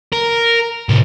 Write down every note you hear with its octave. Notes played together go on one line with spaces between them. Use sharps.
A#4
A2 C3